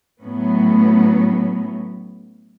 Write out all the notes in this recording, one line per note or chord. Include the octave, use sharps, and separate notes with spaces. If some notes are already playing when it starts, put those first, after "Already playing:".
A2 F#3 A3 B3 C#4